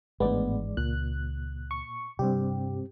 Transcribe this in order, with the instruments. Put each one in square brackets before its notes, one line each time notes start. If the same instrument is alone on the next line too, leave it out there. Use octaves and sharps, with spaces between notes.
[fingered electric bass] G#1 E3 D4 [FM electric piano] A2 B3 [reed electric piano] G#3 D5
[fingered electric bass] C#2 [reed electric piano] A#2 [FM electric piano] F#6
[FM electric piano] C#6
[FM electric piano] G2 G4 [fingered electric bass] C3 [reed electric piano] G3 C4